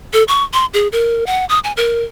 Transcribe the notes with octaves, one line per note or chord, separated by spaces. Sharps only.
A4
C#6
C6
G#4
A#4
F#5
D#6
G#5
A#4